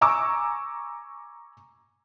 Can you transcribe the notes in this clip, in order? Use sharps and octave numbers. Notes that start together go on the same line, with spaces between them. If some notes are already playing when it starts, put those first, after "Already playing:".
G#5 A#5 C#6 D6 E6